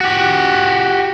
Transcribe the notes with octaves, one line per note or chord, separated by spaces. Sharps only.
F#4 G4